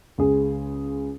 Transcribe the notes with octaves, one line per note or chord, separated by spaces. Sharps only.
C#2 G#4